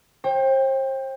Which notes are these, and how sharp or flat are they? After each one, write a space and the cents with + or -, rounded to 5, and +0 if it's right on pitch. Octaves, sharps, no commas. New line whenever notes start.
C5 +40 G5 +15